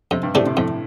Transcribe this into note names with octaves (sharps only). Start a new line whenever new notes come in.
F2 C3
G2
A2 C3 A3 D4
C3
F2 A2